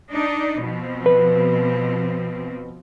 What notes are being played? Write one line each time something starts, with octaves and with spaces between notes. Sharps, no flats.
D4 D#4 D5
B2 F3 C4
B4